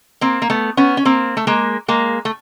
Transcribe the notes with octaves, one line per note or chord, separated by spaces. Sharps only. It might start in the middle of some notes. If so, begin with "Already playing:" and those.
A#3 C4
A#3
A3 B3
B3 C#4
C#4
A#3 C4
A3
G#3 A#3
G#3 A#3
A3